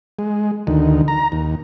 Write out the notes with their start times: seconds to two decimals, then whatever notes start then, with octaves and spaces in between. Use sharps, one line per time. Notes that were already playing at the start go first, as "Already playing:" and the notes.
0.19 G#3
0.67 D2 D#3
1.08 A#5
1.32 D#2